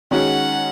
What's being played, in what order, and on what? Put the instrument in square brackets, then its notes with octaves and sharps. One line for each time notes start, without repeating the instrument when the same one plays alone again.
[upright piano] D#3 G#3 C#4 F#4 [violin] F#5